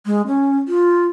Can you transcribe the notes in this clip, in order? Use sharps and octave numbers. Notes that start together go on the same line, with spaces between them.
G#3
C#4
F4